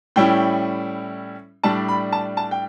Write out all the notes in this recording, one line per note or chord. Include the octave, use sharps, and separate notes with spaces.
A2 G3 C#4 E4 G5
A2 G3 D4 A5
B5
A5
A5
G5